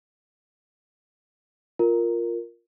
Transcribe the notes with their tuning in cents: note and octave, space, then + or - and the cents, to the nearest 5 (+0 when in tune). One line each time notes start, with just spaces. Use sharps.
F4 +0 A#4 +0